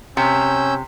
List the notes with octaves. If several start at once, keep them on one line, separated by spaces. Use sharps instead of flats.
C3 C#4 E6 G6